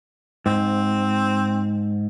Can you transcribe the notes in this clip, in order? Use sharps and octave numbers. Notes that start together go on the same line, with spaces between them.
G#2 C4